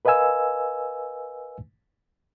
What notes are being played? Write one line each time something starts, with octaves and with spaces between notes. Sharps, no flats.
A#4 B4 D#5 F5 G#5 E6